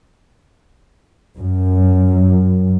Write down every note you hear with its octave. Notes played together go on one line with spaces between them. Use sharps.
F#2